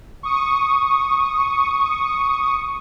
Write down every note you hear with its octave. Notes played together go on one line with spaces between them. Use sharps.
C#6 D#6